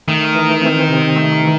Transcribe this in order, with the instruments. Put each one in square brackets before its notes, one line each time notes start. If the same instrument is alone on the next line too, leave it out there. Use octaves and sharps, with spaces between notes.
[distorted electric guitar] D#3 [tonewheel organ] A3
[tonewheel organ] E3
C4
C3
A3
E3